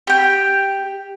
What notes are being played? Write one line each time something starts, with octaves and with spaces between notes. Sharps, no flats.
G4 G5